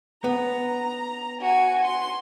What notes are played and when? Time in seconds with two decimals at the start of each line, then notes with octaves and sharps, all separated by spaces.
0.24 B3 A#5
1.41 F#4 G#5
1.85 C6